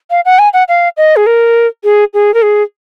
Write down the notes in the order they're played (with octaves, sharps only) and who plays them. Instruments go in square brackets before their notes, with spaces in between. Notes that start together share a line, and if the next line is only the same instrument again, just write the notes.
[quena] F5
F#5
G#5
F#5
F5
D#5
G#4
A#4
G#4
G#4
A#4
G#4